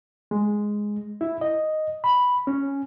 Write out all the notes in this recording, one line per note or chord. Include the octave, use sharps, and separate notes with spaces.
G#3
E4
D#5
B5
C#4